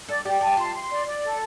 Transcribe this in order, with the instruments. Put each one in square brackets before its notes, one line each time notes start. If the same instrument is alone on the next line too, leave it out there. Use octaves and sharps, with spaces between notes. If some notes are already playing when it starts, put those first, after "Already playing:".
[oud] A4 [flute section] D5
[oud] G4 [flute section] D5
[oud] G4 [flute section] A5
[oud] F4 [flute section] C6
[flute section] C6
D5
D5
A4